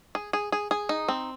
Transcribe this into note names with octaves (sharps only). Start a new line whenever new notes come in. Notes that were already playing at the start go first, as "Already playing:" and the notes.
G#4
G#4
G#4
G#4
D#4
C4